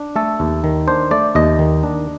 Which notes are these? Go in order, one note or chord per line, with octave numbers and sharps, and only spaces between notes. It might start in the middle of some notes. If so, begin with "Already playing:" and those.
Already playing: D4
A3 A4
D#2
D#3
D4 C5
A3 D5
D#2 D#5
D#3
D4